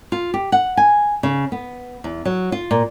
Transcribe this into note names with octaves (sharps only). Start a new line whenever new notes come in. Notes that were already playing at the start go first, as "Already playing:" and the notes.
F4
G4
F#5
G#5
C#3
B3
E2
F#3
F4
A#2